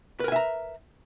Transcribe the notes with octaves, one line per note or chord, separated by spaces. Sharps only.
A#4 B4 E5 G#5 A#5